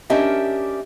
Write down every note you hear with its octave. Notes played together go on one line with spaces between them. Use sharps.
C#4 D4 G4 A#4 D#5 E5